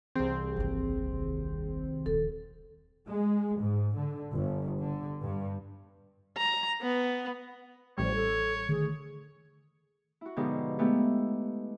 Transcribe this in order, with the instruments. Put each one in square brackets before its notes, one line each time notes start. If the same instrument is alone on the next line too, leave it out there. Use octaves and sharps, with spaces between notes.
[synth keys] C2 C4 [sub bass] E3 [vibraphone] G#4
[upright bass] G1 D#2
[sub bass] D#3
[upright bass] D#1 C#2 [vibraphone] A4
[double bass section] G#3
G#2
D3
G1
D3
G2
[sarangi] A#5
B3
[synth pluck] A1 G3 [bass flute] F3 [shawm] C#5
[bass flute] A4
[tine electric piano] D3 D#3 A3 [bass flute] G#4
[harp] E4 F#4
G#2 B2 D3 F3 D#4 G4
G#3 A3 B3 D#4 G4